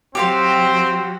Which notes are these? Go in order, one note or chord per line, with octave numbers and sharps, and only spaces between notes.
F#3 C4 F#4 G4 F5 C6